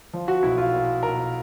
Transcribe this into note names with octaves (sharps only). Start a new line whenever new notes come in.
F3
F#4
B1 E4
F4
A#2
B1 A#4